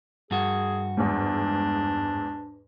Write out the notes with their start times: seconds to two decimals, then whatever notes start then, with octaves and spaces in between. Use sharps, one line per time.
0.31 G2 F#4 G#4
0.97 E2 G#2 D4